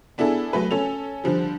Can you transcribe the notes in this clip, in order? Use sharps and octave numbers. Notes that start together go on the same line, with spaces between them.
B3 D4 E4 G#4 A4
F#3 A3 B4
C#4 A4 F7
D3 F3 G3